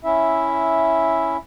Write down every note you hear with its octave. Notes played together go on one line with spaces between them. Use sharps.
C#4 E4 E5